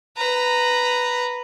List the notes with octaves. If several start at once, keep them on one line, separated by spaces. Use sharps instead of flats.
B4 A#5